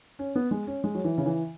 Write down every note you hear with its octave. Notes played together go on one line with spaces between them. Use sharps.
C#4
B3
G#3
C#4
G#3
F#3
E3
C#3
E3